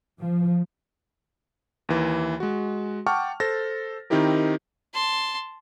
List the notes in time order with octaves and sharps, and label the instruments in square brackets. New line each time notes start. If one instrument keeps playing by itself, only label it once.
[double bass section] F3
[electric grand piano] D#2 E3
G#3 F#4
F#5 G5 A5 C#6 D6 F6
A4 C5 A6 A#6
D#3 C4 D#4 E4 G4 A#4
[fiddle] A5 C6